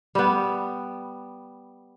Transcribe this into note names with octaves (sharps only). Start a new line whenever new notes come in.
G3 B3